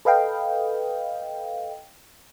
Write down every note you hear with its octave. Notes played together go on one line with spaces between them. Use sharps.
A4 B4 D#5 F5 G5